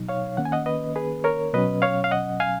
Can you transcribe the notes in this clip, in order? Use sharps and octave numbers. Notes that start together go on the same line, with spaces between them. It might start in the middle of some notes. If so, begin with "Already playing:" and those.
Already playing: B2 F#3 D#4
C#5 F5
D#3 A#3 C#4 F#5
G#5
D#5 F#5
B4 D#5
G#4 B4
A#4 C#5
B2 F#3 C#4 B4 D#5
C#5 F5
F5
D#5 F#5
F5 G#5